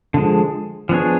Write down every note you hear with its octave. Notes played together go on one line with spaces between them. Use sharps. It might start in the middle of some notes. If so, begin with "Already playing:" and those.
D3 F3 G#3
F3 B3 D4 G#4 C#5